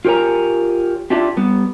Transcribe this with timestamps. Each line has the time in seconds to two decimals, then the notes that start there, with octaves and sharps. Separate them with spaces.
0.05 F4 G4 A#4 C#5 G#5 A#5
1.10 D4 E4 F4 G4
1.37 G3 B3